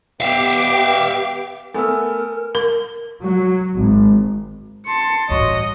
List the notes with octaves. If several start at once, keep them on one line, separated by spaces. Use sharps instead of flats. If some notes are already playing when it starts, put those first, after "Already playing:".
B3 G4 E5 F5 D6
A3 B3 A#4 G#5 E6
A#4
F#3
G#1
A5 C6 C#7
A1 G2 F#4 C#5 D#5